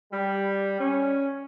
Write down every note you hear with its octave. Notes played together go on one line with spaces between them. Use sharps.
G3
C#4